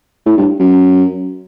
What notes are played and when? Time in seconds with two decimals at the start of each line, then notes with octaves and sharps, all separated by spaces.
0.26 A2
0.37 G2
0.60 F#2